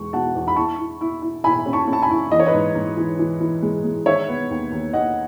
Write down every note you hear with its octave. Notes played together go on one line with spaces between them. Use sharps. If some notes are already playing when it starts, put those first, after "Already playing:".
Already playing: E2 G#3 C#6
B2 F#5 A5
E2
B5
E4 A5 C#6
E4
E4
E4
E4 G#5 B5
C#4
A5 C#6
C#4
A5
G#5 B5
E4
E3 D#5
C#5
B4 D#5
G#2
G#2
E3
E3
E3
G#3
G#3
D#3 C#5 E5
B3
D#2
D#2
D#2 D#5 F#5